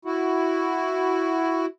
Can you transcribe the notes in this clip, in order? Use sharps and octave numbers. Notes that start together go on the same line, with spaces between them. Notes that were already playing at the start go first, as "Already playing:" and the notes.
E4 F#4